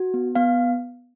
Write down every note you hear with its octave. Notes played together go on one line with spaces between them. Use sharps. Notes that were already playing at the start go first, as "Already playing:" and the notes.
Already playing: F#4
B3
B3 F5